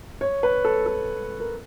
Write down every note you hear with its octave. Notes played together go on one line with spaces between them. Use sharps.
C#5
B4
A4
A4
A#4